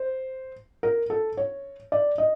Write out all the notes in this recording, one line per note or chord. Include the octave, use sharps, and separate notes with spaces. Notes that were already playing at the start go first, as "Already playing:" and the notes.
Already playing: C5
A#4
A4
C#5
D5
D#5